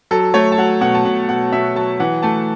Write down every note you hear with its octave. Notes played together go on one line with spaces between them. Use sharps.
F#3 A4
A3 C#5
A5
F#3 F#5
B2 F#5
A5
B2 F#5
B2 F#5
B2 E5
F#3 A5
E3 F#5
A3 A5